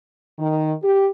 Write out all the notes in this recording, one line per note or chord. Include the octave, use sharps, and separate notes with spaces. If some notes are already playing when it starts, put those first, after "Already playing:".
D#3
G4